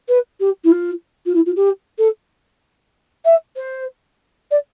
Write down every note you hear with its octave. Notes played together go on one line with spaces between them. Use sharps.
B4
G4
E4
F4
F4
E4
F4
G4
A4
E5
C5
D5